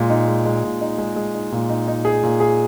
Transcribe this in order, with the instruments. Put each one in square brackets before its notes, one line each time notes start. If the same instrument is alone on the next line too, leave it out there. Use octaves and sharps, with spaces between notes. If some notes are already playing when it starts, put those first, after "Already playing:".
Already playing: [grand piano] A#2 G#3
D#4
G#3
G#3
A#2
D#4
G#3
G#3
D#4
A#2
D#4
D#4
G#4
A#2
G#4